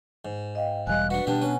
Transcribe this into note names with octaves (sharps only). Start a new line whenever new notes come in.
G#2
D#5 F5 G5
E1 G3 D#5 F5 G#5 F#6
D4 F#4 B4 F#5
B2 G3 B3 D4 G4
C#4 B4 F#5 G#5